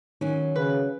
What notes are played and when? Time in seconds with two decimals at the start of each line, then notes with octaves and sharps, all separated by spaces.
0.21 D#3 F#3 C#4
0.55 C#3 B4